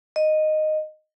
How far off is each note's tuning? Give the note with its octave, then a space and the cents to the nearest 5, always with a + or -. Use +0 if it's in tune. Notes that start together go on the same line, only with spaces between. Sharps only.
D#5 -10